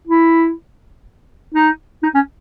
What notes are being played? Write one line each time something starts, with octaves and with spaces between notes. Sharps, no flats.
E4
D#4
D#4
C#4